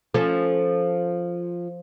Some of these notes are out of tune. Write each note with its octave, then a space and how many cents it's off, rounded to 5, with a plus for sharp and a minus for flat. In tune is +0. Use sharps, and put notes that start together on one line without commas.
F3 +0 C#4 +0 A4 +0